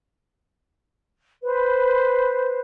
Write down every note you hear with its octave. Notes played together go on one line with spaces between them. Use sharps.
B4 C5